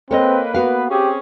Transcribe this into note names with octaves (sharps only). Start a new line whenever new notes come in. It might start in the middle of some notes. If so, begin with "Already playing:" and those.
A#3 C4 A4 B4 C#5 D#5
B3 F#4 F5
C4 C#4 G4 G#4